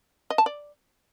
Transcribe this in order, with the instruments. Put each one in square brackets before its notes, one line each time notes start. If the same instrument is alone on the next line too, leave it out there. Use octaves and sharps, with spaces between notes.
[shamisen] D#5
A5
D5